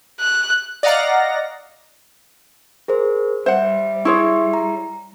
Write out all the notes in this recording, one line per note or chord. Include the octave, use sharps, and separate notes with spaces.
F#6
D5 D#5 F5 F#5 A#5 A#6
G#4 A#4 C5
G3 C5 E5 F#5
E4 G#4 C#5 E5 C6 C#6
A#5